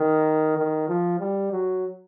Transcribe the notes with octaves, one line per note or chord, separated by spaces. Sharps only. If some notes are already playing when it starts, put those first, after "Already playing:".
Already playing: D#3
D#3
F3
G3
F#3